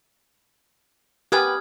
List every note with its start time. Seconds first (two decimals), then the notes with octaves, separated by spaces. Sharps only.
1.32 A#3 B3 G4 B4 G#5 D#6 F6 G#6